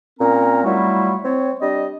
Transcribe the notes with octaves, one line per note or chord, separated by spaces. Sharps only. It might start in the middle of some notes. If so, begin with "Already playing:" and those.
A#2 C4 C#4 A#4 A#5
F#3 G3 A3 E4 F4
C4 C#5
G3 D4 D#5